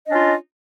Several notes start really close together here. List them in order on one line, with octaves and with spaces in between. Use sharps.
D#5 D4 C#4 F4